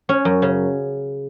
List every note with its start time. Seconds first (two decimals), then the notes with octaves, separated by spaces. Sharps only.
0.09 C#4
0.25 F#2
0.42 C#3